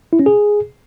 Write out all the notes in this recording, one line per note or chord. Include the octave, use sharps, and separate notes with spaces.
E4
C#4
G#4